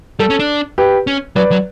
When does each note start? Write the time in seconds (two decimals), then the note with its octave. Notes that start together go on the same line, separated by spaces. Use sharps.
0.19 G3 A4
0.30 C#4
0.39 D4
0.78 G4 B4
1.07 C#4
1.36 F#3 B4 D5
1.51 F#3